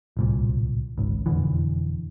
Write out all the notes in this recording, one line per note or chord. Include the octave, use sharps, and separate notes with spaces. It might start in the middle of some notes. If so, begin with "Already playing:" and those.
D1 C2 A#2
G#1 C#2
E1 F2 D3 E3